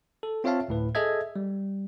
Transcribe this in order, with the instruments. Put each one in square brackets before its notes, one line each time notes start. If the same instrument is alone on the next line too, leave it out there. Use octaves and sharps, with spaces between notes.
[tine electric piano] A4
C4 F4 C#5 E5 F5 A5
D2 A2 B4
G#4 A4 D#5 E5 G#6
G3